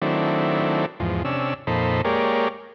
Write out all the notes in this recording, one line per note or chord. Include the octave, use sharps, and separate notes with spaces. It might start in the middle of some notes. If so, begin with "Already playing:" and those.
D#3 F#3 A3 C4 D4 E4
E2 G#2 F3
C3 C#4 D4 E6
F2 A#2 D#4 A4 C5 B5
G#3 A#3 G4 A#4 C#5 D5